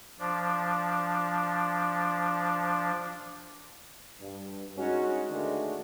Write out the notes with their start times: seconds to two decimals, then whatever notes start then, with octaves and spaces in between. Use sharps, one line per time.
0.19 F3 D4
4.20 G2
4.77 G#3 C#4 D#4 F#4
5.30 D3 D#3 G#3 A3 D4 F#4